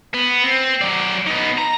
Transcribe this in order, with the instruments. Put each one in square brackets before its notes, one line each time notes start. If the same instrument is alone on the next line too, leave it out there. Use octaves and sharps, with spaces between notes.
[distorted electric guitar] B3
C4
F#3 D5
B3 D#4
A#5